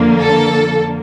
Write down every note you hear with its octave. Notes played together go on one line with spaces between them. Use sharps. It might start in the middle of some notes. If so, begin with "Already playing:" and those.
Already playing: F2 D3 F3 A#3
A4